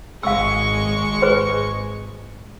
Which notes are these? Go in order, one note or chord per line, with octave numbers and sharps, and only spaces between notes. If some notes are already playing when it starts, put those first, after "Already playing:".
G#1 G#3 F5 C#6 E6
G#4 B4 C5